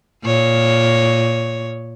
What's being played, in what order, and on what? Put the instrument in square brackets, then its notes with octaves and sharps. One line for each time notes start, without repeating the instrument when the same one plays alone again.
[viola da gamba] A#2 C#5